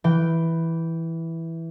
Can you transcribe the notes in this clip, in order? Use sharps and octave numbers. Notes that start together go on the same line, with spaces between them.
E3 G5